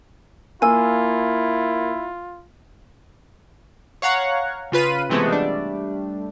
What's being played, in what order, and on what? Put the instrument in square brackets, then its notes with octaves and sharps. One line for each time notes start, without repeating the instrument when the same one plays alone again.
[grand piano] A#3 [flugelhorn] E4 [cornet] F4 [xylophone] G#5 E6
[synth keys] C#5 F5 F#5 A#5 C#6
C#3 F4 B4 D#7
C3 E3 G#3 A3 B3 C4
G3 A3 D4